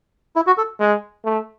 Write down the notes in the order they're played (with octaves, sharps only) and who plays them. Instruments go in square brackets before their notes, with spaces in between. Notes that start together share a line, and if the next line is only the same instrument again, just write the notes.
[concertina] E4
F#4
A4
[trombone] G#3
A3